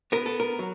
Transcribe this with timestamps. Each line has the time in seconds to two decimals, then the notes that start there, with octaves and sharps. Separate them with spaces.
0.12 B3 A#4
0.26 A4
0.40 A#4
0.59 F#3